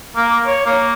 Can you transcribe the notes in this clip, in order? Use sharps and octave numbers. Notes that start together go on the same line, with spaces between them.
A#3
C#5
A#3